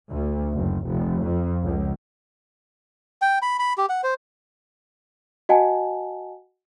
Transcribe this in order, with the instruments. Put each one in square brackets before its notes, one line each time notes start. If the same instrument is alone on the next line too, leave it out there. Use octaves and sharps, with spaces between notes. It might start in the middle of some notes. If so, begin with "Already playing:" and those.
[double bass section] D2
F#1
F1
F2
C#2
[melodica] G5
B5
B5
G4
F#5
C5
[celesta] F#4 D#5 F#5 G#5 A5